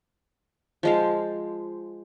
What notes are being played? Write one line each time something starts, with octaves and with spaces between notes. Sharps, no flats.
F3 G#3 F5